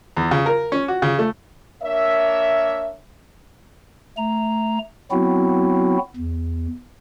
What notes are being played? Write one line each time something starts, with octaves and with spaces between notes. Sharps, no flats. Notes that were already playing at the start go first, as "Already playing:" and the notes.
E2
C#3
A#4
C#4
F#4
C#3
A3
A#3 D4 A#4 C#5 E5
A3 A#5
F#3 B3 C4 E4 F#4
E2